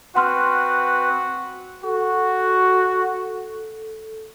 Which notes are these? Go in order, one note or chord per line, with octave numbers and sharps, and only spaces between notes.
C4 F#4 B4 F#5 C6 F6
F#4 A4